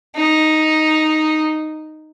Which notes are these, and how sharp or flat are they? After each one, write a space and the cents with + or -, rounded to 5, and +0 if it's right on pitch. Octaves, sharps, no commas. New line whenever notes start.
D#4 +0